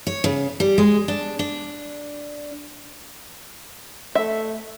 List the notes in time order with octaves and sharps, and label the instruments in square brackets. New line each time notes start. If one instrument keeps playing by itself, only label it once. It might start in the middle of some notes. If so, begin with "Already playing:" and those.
[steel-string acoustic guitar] C#5
C#3
G3
G#3
D4
D4
[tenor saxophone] A3 [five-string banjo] E5